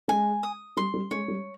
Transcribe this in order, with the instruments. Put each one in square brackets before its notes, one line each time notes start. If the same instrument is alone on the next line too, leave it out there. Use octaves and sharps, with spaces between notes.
[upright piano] G#3 [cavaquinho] G#5
[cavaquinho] D#6
[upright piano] G3 [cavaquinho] C6
[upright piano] G3
[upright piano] G#3 [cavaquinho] C#5
[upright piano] G3